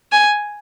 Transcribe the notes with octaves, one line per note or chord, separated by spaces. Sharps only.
G#5